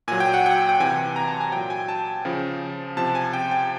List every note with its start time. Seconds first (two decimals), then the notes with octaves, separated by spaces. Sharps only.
0.08 A#2 F#3 G#5
0.20 G5
0.34 F#5
0.46 G5
0.69 G5
0.80 C3 E3 G#5
1.16 A#5
1.27 A5
1.40 G#5
1.52 A#2 F#3 G5
1.70 G#5
1.89 A5
2.25 C#3 F3
2.97 C3 F3 A5
3.15 G#5
3.33 G5
3.51 G5